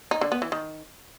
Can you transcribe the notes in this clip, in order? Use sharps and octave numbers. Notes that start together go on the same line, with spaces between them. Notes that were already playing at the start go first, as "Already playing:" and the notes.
D#4
D3
B3
E3
D#3